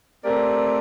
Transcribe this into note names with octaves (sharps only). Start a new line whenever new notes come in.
A3 C4 G4 A#4 D5